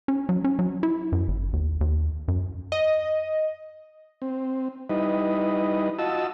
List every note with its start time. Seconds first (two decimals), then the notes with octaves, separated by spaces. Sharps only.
0.08 C#4
0.29 F#3
0.44 C#4
0.59 F#3
0.83 E4
1.12 F#2
1.28 G1
1.53 D#2
1.81 D#2
2.28 F#2
2.72 D#5
4.22 C4
4.90 G3 D#4 E4 B4 D#5
5.99 F4 F#4 D#5 A5 E6